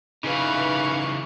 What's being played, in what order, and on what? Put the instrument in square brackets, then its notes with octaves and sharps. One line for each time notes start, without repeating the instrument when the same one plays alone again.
[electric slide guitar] C#3 E3 [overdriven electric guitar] D#4 B4 [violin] F5 C#6